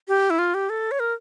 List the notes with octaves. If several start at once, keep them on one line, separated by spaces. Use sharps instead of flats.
G4
E4
F4
G4
A4
C#5
A#4